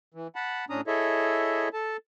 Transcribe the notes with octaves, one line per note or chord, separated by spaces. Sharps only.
E3
F#5 A5 B5
A2 C#4 D4 A#5 D#6
E4 G#4 A4 C#5 D#5 E5
A4 A5